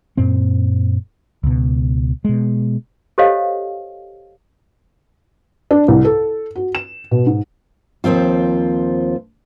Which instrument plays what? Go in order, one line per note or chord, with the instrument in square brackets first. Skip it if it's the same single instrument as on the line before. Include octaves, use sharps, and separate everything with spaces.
[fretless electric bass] F#2 A#2 C4
C#2 B2
B2 G#3
[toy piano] G4 A4 C5 C#5 D#5 F5
[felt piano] D4
C2
A4
F#4
E7
B2
G#2
[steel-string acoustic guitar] D#2 F3 C4 F4